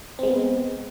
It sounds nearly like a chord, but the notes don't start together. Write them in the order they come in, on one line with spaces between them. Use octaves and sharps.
C4 G#3 B3